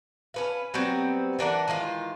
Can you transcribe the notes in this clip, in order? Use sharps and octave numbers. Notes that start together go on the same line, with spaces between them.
C#4 B4 F5
F#3 G3 B3 C4
E3 D4 A#4 F#5
D#3 E3 G#3 F4